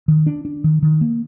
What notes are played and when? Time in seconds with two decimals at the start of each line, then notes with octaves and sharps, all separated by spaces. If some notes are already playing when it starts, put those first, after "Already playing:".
0.08 D#3
0.26 D4
0.45 D4
0.64 D#3
0.82 D#3
1.01 A#3